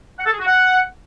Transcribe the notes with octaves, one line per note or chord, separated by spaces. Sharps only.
F#5
A4
G#4
F#4
F#5